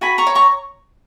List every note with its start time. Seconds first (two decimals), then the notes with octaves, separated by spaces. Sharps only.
0.01 F#4 G#5 B5
0.18 A#5 C#6
0.27 C#5
0.35 A#5 C#6